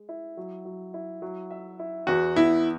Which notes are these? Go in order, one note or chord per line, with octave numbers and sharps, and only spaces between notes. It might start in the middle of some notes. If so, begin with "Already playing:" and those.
Already playing: G#3
E4
F#3
F#3
E4
F#3
E5
E4
E2 F#4
B3 E4